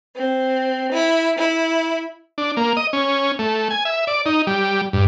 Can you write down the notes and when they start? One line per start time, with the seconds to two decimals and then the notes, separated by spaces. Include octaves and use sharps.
0.16 C4
0.92 E4
1.38 E4
2.38 D4
2.57 A#3
2.77 D#5
2.93 C#4
3.39 A3
3.70 G#5
3.85 E5
4.07 D5
4.26 D#4
4.47 G3
4.93 G2